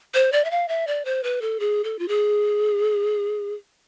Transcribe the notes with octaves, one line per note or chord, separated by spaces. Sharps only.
C5
D5
E5
F5
E5
D5
C5
B4
A4
G#4
A4
F4
G#4